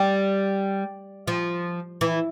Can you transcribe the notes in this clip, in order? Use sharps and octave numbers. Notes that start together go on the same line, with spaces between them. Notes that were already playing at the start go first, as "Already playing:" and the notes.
Already playing: G3
F3
E3